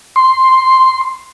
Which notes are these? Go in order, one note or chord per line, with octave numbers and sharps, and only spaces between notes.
C6